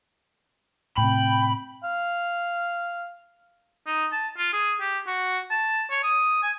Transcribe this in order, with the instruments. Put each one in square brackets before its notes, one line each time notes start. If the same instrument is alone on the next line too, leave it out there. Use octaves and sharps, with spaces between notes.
[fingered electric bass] A2 C3 [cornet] G5 [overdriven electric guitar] B5
[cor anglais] F5
[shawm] D#4
A5
F4
G#4
G4
F#4
A5
C#5
D#6
G#5